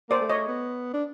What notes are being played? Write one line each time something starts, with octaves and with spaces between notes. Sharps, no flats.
A#3 C5 D5
A3
C#5 D#5
B3
D4